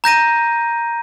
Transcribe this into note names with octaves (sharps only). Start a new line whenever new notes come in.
A#5 G6 A#6 D#7